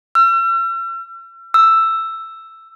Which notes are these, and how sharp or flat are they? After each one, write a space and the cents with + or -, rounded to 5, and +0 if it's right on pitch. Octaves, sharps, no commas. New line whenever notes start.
E6 +45
E6 +5